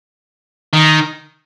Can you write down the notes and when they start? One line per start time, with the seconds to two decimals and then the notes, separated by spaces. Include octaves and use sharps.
0.73 D#3